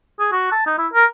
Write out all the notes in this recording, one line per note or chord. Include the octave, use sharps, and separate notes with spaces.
G#4
F#4
A5
D#4
E4
A#4